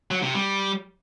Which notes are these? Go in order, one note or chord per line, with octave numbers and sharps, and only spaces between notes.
F#3
C3
G3